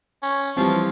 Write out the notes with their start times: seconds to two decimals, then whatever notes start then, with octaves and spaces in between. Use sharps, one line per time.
0.23 C#4
0.57 E3 F3 G3 C4